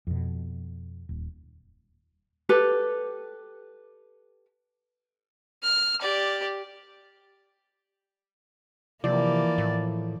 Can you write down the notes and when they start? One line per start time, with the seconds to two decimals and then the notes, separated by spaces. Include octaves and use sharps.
0.07 F2 B2
1.09 D#1
2.49 G4 A4 B4
5.63 F6
6.02 G4 D5
9.04 C3 E3 F3 A#3 D5
9.58 A2